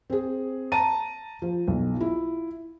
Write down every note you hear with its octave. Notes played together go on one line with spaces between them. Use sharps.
C4 G#4
A5 A#5 D#7
F3
B1
E4 F4